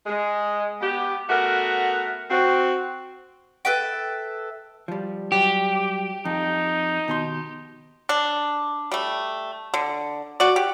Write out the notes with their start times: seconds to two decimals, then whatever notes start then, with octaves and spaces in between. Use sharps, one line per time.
0.07 G#3
0.81 B3 G4
1.30 A3 B3 F#4 A#4 F#5
2.31 C4 F#4
3.65 A4 B4 E5 G5
4.88 F3 G3
5.32 F#3 G3 G4
6.25 F2 D#4
7.08 B2 D#3 C6
8.09 D4
8.91 G3 A3
9.74 D3
10.40 F#4 D5
10.56 G4